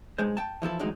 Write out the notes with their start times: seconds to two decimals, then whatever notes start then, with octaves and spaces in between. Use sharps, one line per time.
0.18 B1 G2 G#3 C5
0.37 G5 A5
0.62 E3 F3 E4 A4
0.79 E2 A2 D3 F#3 G#3 D#4